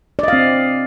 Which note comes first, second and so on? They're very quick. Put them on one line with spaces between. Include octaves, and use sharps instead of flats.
D5 D#5 F5 C4